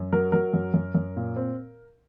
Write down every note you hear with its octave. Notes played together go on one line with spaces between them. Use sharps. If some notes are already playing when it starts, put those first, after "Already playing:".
Already playing: F#2
F#3 A#4
F#3 A#4
F#2
F#2
F#2
A#2
C4